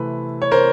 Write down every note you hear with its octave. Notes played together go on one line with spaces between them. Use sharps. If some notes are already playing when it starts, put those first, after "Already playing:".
Already playing: C3 E3 A3 B4
C#5
A#4 C5